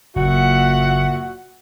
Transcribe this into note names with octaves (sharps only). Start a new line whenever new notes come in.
F#1 A#2 F#4 E5 F#5